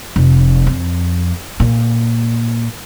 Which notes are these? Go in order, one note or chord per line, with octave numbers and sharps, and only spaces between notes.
F1
F2
A#2